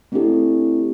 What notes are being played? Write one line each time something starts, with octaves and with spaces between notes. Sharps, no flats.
A3 C4 D4 E4 G4 A4